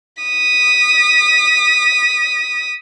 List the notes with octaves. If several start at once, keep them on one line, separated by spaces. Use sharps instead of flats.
D#6 B6